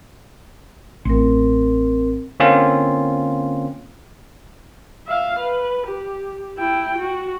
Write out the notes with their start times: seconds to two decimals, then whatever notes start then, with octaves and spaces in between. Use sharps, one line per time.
1.05 A1 C4 A#4
2.40 D3 A#3 C4 C#4 F4
5.08 E5 F5
5.40 B4
5.87 G4
6.58 E4 G5
6.98 F#4